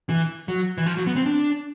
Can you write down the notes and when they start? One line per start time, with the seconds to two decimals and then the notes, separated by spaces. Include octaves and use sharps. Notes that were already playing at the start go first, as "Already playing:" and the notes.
0.09 E3
0.48 F#3
0.78 E3
0.86 F3
0.97 F#3
1.07 B3
1.16 C4
1.26 D4